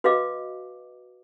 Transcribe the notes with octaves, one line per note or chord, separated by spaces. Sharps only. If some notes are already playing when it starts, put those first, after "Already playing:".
F#4 B4 D#5 F5 D6